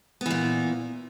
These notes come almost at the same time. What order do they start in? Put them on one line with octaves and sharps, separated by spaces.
B3 E3 A#2